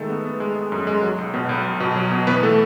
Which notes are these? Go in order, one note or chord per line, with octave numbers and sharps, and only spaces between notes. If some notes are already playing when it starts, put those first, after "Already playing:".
Already playing: D#3 G#3 A3 A4
B3
B3
G#3
G#3
F#2
G#3
F#3
B1
B2
B1
B1
B2
F#3
B2
E3 B3 B4
A3 A4